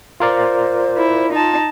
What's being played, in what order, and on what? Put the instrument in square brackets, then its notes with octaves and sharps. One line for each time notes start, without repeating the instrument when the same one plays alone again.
[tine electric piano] F4 A#4 D5 [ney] C5
[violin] E4
[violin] D#4 A5 [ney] F4